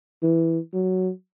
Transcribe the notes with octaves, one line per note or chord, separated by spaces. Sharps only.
E3
F#3